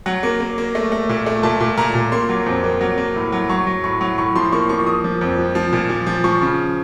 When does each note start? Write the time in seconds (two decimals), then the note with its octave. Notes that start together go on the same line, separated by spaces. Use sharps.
0.06 F#3 F#5
0.23 A#3
0.40 A#3
0.58 A#3
0.75 A3
0.92 A3
1.09 A#2
1.26 A3
1.43 A#2 A5
1.60 A#2
1.77 A#2 A#5
1.95 A#2
2.12 A#3 C6
2.29 F#3
2.46 F2
2.64 A#3
2.81 F#3
2.98 A#3
3.16 A2
3.32 F#3
3.49 F#3 C#6
3.67 F#3
3.84 A2 C#6
4.01 F#3
4.18 A2 C#6
4.35 F3 C6
4.52 A#3 C#6
4.69 F3 C#6
4.87 A#3 D#6
5.04 F3
5.21 F2
5.38 F3
5.55 F3
5.73 A#2
5.89 F3
6.07 F3
6.24 F3 C#6
6.41 C#3